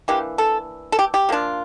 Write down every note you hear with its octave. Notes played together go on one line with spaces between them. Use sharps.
E3 A#3 D4 G4
A4
A4
G4
G4
F3 A#3 D4 F4